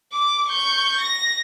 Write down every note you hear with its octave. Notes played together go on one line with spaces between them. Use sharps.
D6
C#6 G6
A#6